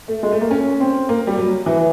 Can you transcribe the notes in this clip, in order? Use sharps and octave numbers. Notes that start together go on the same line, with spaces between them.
A3
G#3
A3
A#3
C#4
C4
A#3
G3
F#3
E3